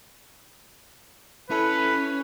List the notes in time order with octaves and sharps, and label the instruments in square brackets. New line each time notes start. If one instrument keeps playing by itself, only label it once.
[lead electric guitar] C#4 [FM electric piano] E4 A4 B5 [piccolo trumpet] B4